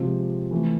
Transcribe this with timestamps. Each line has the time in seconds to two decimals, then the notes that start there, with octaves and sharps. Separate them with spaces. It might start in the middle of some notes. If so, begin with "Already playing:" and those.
Already playing: C3 F3 G#3 C4
0.51 E3 A3 C4